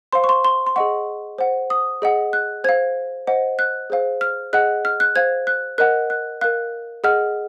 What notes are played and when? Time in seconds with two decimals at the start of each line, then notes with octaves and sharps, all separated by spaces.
0.12 C5 F5 C6
0.24 C#6
0.29 C6
0.44 C6
0.67 C6
0.76 G#4 D#5 F#5 C#6
1.38 C5 F#5
1.70 D#6
2.02 G#4 D#5 F#5
2.33 F#6
2.64 C5 F5 G#6
3.27 C5 D#5 F#5
3.59 F#6
3.90 G#4 C5 F5
4.21 F6
4.53 G#4 D#5 F#5 F#6
4.85 F6
5.00 F#6
5.16 C5 F5 G#6
5.47 F#6
5.78 A#4 D#5 F#5 F#6
6.10 F#6
6.41 A#4 F5 F#6
7.04 G#4 D#5 F#5 F6